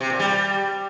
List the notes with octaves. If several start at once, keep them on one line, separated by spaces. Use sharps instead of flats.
C3
A#2
G3